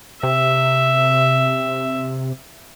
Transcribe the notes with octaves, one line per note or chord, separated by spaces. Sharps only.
C3 E5